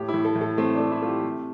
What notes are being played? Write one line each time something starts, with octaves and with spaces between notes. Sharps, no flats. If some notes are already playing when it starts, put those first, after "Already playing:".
Already playing: A2 G4
E4
A2
A4
A2
A4
A3 C4
A3 D4
E4
A3 F4
G4
C3